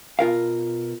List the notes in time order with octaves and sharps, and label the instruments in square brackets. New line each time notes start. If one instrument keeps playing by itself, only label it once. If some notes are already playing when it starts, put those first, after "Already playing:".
[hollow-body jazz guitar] B2 F4 A#4 F5